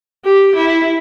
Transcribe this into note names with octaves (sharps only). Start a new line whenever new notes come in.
G4
E4